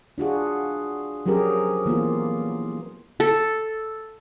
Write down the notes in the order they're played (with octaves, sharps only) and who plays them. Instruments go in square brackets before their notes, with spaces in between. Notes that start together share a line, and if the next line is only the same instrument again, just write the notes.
[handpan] D4 F4 F#4 G#4
F3 F#3 C#4 G4 G#4 A#4
E3 A#3 B3 F4
[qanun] A4